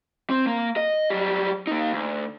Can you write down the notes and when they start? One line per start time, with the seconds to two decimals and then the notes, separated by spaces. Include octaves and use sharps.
0.30 C4
0.47 A#3
0.77 D#5
1.10 F#3 G3
1.67 A#3 D#4
1.93 D2